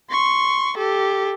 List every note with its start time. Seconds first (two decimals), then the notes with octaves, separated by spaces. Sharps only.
0.11 C6 C#6
0.77 G4 A4